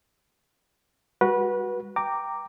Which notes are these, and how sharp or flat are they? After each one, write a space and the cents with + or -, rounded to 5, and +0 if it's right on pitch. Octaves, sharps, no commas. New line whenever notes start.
G3 +40 F#4 +0 B4 -25
G5 +0 A#5 -10 D6 +0